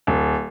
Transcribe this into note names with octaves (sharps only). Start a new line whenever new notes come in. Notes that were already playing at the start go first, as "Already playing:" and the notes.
D1